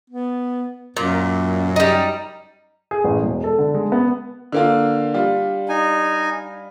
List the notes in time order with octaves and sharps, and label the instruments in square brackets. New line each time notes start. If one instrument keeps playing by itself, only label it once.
[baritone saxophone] B3
[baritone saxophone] F#2 [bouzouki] A#2
[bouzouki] G3 D#4
[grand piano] G#4
A1
E1
A4
D3
G#3
B3
[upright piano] D3 A#3 F4
G3 D4 F4
[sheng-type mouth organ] D#4 G#5